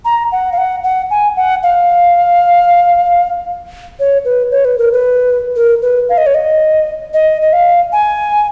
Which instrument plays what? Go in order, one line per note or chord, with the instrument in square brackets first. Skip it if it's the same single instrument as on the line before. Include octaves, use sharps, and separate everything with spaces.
[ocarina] A#5
F#5
F5
F#5
F#5
G#5
F#5
F5
C#5
B4
C#5
B4
A#4
B4
A#4
B4
F5
D#5
C#5
D#5
D#5
D#5
F5
G#5